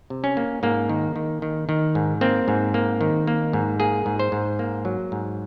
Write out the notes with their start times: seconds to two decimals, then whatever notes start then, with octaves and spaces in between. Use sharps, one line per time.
0.10 C3
0.24 C#4
0.37 A#3
0.63 G#2 A#3
0.89 D#3
1.16 D#3
1.42 D#3
1.69 D#3
1.95 G#2
2.21 A#3 C4
2.48 G#2
2.74 A#3
3.01 D#3
3.27 A#3
3.53 G#2
3.80 A#3 G#4
4.06 G#2
4.19 C5
4.32 G#2
4.59 A#3
4.85 F#3
5.12 G#2